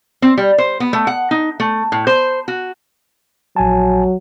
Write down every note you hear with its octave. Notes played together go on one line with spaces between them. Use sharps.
C4
G3
C5
B3
A3
F#5
D#4
A3
A2
C5
F#4
A#1 F#3 G#5 A5